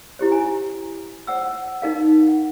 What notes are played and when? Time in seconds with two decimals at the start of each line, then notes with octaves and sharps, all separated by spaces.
0.19 E4 G4 C5
0.32 G#5 A#5
1.27 C5 F#5 E6
1.82 D#4 A#4 F5
2.28 F#5